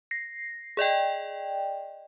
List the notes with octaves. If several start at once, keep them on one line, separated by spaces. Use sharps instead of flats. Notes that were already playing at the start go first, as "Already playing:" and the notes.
A#6 C7
G#4 D5 D#5 G5